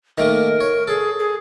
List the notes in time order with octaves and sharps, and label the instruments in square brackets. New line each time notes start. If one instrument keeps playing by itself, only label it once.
[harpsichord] D#3 A3 A#3 [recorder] A#4
[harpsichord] C#5
[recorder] G#4 [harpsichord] A4
[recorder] G#4